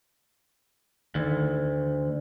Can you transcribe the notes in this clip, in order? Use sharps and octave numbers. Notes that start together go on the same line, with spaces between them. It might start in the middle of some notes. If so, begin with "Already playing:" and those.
D2 D#3